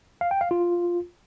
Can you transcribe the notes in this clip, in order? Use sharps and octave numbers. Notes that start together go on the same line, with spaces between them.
F5
G5
F5
F4